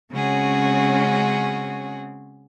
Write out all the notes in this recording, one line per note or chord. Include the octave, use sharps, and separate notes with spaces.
C#3 G#3 C4 C#4 F#4 G#4